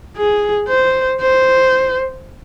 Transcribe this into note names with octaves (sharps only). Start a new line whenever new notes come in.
G#4
C5
C5